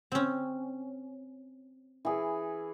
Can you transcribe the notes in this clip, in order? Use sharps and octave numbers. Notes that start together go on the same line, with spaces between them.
C4 C#4
E3 G#4